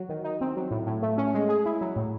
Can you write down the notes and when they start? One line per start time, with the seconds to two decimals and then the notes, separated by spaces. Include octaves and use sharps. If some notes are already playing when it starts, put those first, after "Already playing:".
Already playing: F#3 F#4
0.09 D#3
0.24 D#4
0.41 C4
0.57 F#3
0.71 A2
0.87 A2
1.02 A3
1.18 C#4
1.34 G#3
1.49 G#4
1.66 E4
1.81 F#3
1.96 A2